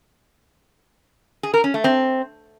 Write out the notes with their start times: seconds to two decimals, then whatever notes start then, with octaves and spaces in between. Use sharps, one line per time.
1.43 G#4
1.54 A#4
1.64 C#4
1.74 A3
1.84 C4